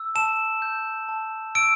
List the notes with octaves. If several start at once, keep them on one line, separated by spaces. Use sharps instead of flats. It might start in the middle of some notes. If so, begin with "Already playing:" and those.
Already playing: E6
A5 E7
G6
A5
E6 D7